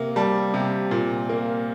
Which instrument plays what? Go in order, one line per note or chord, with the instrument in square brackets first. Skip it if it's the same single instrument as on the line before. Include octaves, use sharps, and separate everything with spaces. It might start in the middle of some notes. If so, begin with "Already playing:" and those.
Already playing: [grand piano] C3 A#3
G3 A5
C3
A#2
A#3